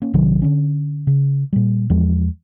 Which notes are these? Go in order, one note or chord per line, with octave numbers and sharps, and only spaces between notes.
A#3 C#4
A#1 C3 D#3 F#3
D3 C#4
C#3
A#2 G3
E2 F3 G#3